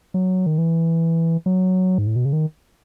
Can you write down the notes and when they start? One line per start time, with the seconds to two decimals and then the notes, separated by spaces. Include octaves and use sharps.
0.14 F#3
0.46 D#3
0.58 E3
1.46 F#3
1.98 G#2
2.07 A2
2.16 B2
2.25 C#3
2.33 D#3